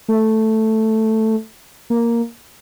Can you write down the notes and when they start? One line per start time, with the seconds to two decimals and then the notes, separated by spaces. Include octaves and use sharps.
0.08 A3
1.90 A#3